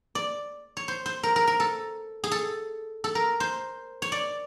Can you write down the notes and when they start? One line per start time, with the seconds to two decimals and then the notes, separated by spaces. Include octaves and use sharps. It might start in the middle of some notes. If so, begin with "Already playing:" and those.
0.15 D5
0.77 C#5
0.88 C5
1.06 C5
1.23 A#4
1.36 A#4
1.47 A#4
1.60 A4
2.24 G#4
2.32 A4
3.04 A4
3.15 A#4
3.40 C5
4.02 C#5
4.12 D5